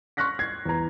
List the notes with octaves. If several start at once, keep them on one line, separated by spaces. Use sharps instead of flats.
C6 C#6 F6 F#6 A#6 B6
G#6 C7
E2 A#5